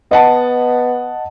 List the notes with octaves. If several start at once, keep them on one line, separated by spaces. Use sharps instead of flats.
B3 D#5 F#5 A5